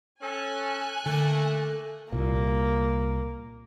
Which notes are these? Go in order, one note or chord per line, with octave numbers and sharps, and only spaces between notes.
C#4 A4 G#5 F#6
D3 A3 A#3 A4
C2 A#2 A#3